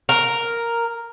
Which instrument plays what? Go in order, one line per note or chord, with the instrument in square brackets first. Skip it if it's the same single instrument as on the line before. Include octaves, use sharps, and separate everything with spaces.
[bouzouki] A#4